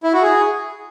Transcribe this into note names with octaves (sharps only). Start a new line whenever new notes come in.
E4
F#4
G#4